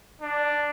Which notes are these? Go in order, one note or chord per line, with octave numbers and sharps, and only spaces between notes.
D4